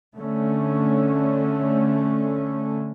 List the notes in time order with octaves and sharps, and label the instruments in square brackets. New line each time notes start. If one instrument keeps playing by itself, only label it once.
[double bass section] D3 A3 C#4